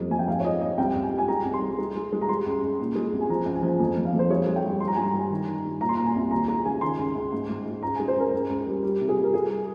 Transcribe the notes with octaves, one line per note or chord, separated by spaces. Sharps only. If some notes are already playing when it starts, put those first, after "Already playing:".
Already playing: F2 G3
F2 G#5
G5
G#2 F5
C#5
G#2 D#5
G#2 D#5
C2 G5
C2
G#5
G3
G#5
G#3 A#5
C2
C6
G#3
G#3
G#3
G#3
A#5
G3 C6
C#2
C#2
A#2
G#3
C2
G#5
F3 A#5
C#2
G#5
F3
F2
F2
F5
F2
C5
G#3 C#5
G#3
G5
G2
G2 C6
A#5
G2 G#5
A#5
G3
D#3
D#3
G2
A#2 A#5
C6
A#2 A#5
G#5
C2
D#2 A#5
G#3 A#5
C#3 G#5
D#3 C6
C#2
C#2
G#2
G#2
G#2
C#2 A#5
G#3 G#5
C5
C#2 A#4
C#2
C#2
G3
G3
C3
G#4
G3
A#4
G3 G#4